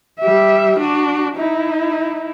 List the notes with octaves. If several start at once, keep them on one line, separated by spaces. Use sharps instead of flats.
G3 E5
D4 F#4
D#4 E4